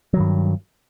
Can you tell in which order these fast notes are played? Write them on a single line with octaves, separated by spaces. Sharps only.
F#3 D#3 G2